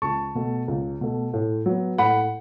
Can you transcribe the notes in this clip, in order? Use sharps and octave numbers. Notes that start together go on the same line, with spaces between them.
C#2 A5 C#6
B2 A3
C#2
B2 A3
A2
F#3 B3
A2 F#5 B5